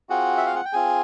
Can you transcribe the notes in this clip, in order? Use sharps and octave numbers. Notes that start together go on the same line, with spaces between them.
C4 F4 F#4 G#4 F#5
E5
F5
F#5
G5
C4 F4 G#4 G#5